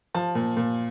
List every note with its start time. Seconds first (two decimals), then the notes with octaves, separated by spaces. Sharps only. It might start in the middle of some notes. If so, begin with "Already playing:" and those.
0.14 F3 A5
0.35 A#2
0.57 A#2